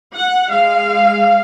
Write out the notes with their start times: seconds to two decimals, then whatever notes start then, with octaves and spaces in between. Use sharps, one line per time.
0.15 F#5
0.50 G#3 F5